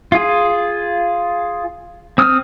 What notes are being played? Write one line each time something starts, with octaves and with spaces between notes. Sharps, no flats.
F4 G#4
C4 D#6 F6